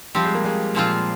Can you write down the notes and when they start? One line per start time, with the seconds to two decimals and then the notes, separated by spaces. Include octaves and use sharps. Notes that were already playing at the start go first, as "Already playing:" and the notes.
0.15 F3 G3 C4 G4
0.25 G#3
0.35 A#3
0.45 G#3
0.75 A#2 F3 C4 F4